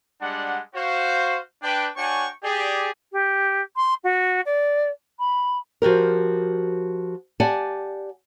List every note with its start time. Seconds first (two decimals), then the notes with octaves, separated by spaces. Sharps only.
0.21 G3 G#3 D4 F#5
0.75 F#4 C5 F5
1.63 D4 B4 G5
1.96 D4 F#4 C#5 G5 G#5 C#6
2.43 G4 G#4 D5
3.12 G4
3.76 C6
4.04 F#4
4.46 D5
5.19 B5
5.82 F3 F#4 G4 A#4
7.40 G4 D5 F#5 G#5 A5